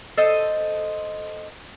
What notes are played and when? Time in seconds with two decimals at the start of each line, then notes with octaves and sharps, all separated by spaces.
0.17 A4 C5 D#5